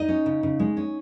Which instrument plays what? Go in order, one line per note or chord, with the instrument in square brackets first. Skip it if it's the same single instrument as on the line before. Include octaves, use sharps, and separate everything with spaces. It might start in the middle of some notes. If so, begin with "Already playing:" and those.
Already playing: [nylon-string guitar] D#4 D#5
C#4
C#3
C#3
G#3
C#4